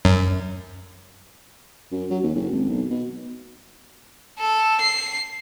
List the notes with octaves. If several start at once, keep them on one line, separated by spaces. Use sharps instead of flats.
F#2
F#2
F#3
D#2
F#1
G#1
B1
B2
A4
C7